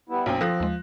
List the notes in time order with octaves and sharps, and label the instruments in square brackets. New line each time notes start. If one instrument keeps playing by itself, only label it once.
[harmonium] G3 B3 E4
[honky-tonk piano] B1 F#2 [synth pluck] A#3 G5 [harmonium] C4
[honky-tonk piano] F3 F#6 A#6 [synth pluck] A4 C5 D#6
[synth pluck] D#2 G#3